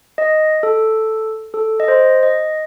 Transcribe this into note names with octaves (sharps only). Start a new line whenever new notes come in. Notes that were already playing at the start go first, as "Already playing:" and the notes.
D#5
A4
A4
D#5
C5
D#5